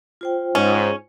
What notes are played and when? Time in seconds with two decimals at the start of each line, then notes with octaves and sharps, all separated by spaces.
0.21 F4 C5 G5
0.55 G#2 C#4